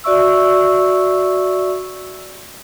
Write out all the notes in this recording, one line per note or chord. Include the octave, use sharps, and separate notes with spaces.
F#4 D5 E5 C#6 E6